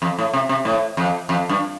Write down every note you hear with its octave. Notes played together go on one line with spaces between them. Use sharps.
F2
A2
C3
C3
A2
F2
F2
G2